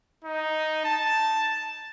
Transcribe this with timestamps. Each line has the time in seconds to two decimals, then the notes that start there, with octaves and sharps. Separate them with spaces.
0.24 D#4
0.85 A5